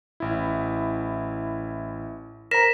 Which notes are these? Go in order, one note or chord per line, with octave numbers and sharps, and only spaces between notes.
A1 E4
A#4 C5 A#5 A#6 B6 E7